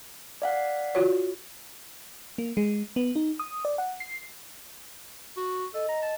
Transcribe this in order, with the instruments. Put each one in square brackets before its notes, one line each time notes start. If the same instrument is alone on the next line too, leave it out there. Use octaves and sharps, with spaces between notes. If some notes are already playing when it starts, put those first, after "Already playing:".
[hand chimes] D5 F5 F#5
[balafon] F4 F#4 C#5
[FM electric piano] A#3
G#3
B3
D#4
D#6
D5
F#5
C7
[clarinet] F#4
[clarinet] A4 [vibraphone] D#5
[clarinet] A#5
A5